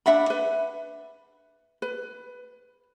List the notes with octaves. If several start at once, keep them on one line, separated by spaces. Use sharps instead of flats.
D4 E5 F#5 B5
B4
B4